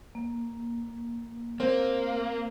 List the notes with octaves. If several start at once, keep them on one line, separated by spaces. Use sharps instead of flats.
A#3
A#3 C4